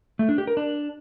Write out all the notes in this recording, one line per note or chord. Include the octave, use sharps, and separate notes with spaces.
A3
D4
G4
A#4
D4